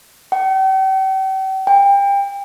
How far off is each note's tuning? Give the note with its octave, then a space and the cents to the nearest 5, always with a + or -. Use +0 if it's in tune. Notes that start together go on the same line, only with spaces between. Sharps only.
G5 -40
G5 +30